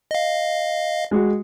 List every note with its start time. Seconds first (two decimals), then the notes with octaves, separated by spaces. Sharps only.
0.11 D#5 F5
1.11 G#3 F#4